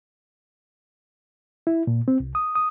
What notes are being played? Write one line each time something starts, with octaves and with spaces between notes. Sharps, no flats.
E4
A#2
C4
C2
D#6
D#6